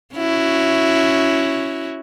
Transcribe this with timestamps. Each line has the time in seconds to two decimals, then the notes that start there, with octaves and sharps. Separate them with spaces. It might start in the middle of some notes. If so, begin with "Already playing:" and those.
0.15 C#4 E4 F#4